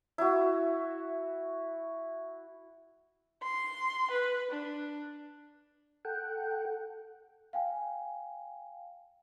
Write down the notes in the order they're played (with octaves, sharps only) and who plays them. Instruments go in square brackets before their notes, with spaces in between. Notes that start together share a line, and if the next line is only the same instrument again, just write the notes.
[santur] E4 F#4
[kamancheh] C6
B4
D4
[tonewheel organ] A4 F#5 G5
[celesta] F5 G5 G#5